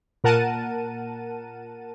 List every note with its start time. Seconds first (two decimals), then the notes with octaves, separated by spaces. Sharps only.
0.24 A#2 A#4 F#5 A5 D#7